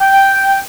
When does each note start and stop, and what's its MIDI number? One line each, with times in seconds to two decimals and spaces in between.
0.01 0.60 79